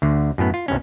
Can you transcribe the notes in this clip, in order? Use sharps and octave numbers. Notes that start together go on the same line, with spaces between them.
D2 D3
F#2 A2 B3
F4
C2 G2 C#4